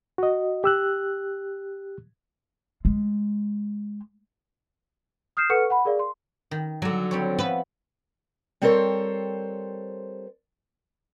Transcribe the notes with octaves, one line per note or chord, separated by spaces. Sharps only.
F#4 D#5
G4 E6 F#6
G#3
D#6 F6 G6 C7 E7
A4 B4 F#5 C#6 F6 C#7
F#5 B5
G#4 A#4 D5 F5
C6
D#3
D3 F#3
G3 C4 C#5
F3 B3 B4 E5
G3 C4 A4 A#4 C5 C#5